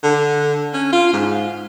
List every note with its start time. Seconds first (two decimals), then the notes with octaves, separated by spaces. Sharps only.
0.03 D3
0.73 C#4
0.93 F4
1.13 G#2